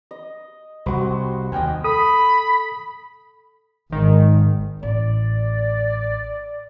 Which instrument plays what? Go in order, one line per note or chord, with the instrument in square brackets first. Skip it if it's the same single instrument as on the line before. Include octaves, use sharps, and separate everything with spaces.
[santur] D#5
[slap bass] C2 [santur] F#4 C5
[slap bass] D#2 [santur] D#5 G5 G#5
[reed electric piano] A4 D#6 [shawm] B5
[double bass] G#1 [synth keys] D#3
[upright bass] A1 [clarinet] D5